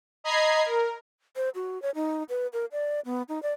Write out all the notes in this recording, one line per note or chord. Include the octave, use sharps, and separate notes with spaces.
D#5 A#5 B5 G#6 C7
A#4
C5
F#4
C#5
D#4
B4
A#4
D5
B3
D#4
D5